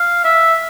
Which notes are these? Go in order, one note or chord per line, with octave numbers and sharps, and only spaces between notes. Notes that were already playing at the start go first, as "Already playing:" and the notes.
Already playing: F5
E5